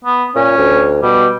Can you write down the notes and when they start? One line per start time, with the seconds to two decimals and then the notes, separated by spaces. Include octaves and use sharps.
0.05 B3
0.36 A#2 C#4
0.58 D2
1.03 B2 G3